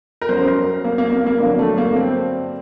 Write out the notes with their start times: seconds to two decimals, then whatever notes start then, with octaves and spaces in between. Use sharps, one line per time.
0.21 A#4
0.29 F#2 F#3 C5
0.48 A#4
0.85 A#3
0.98 A#3
1.13 A#3
1.27 A#3
1.40 G2 D3 F#3 A#3
1.59 A3
1.78 A#3
1.96 C4